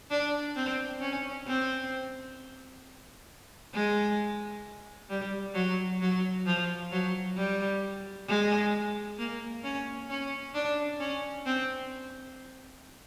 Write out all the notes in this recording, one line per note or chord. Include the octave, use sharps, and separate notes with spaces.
D4
C4
C#4
C4
G#3
G3
F#3
F#3
F3
F#3
G3
G#3
A#3
C#4
C#4
D4
C#4
C4